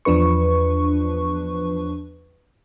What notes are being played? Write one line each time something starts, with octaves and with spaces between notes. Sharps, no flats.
E2 F3 D4 B4 C#6